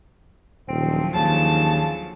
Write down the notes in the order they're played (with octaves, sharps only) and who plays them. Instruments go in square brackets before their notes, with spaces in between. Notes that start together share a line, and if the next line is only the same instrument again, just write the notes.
[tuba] D#1 [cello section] D3 F3 F#3 [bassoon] C4
[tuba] D#2 [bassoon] C#3 [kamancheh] A5